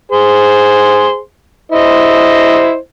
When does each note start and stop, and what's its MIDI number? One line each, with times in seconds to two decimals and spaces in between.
0.12 1.18 68
0.12 1.18 72
0.12 1.18 84
1.72 2.76 64
1.72 2.76 72
1.72 2.76 75